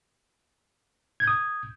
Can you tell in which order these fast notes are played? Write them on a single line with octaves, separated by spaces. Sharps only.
G#6 G6 D#6